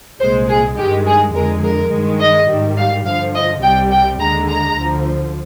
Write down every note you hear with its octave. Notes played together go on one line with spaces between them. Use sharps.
C2 A#2 G#3 C5
G#4
G2 D#3 G#3 G4
G#4
F2 D3 G#3 A#4
A#4
G2 D#3 G#3
D#5
G#2 D#3 G3
F5
G2 D3 F3 F5
D#5
C2 C3 G3 G5
G5
D#2 D3 G#3 A#5
A#5
D2 D3 F3